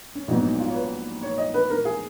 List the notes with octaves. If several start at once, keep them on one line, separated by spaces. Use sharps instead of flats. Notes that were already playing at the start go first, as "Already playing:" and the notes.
C#4
A#1 G#2 F#3 B3 D#4
D#4
F4
C#5
B4
C#5
D#5
B4
A#4
G#4